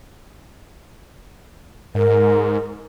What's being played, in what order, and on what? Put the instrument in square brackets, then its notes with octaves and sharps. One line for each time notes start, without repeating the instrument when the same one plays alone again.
[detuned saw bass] G#2 [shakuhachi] A#4